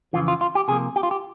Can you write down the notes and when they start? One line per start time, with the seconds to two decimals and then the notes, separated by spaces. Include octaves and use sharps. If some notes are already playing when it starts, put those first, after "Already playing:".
0.13 F2 C#3 E3 F4
0.28 F4
0.41 F4
0.55 G4
0.68 C3 F3 A#3 G#4
0.96 G4
1.03 F4
1.11 G4